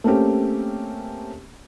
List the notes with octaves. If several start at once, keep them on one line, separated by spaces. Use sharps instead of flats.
A3 A#3 C4 C#4 G4